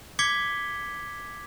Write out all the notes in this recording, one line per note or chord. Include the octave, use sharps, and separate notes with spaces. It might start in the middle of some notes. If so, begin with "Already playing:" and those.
D6 G#6 B6 C#7 G7